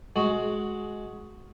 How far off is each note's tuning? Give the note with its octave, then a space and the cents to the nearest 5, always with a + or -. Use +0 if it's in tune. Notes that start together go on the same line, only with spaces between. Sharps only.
G#3 +15 F#4 +0